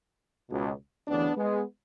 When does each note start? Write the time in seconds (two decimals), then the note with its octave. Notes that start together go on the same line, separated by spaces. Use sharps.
0.50 C#2 B2
1.07 D2 C#3 E3 B3 D4
1.36 G#3 B3